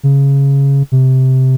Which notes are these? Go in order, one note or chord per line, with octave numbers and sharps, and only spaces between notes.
C#3
C3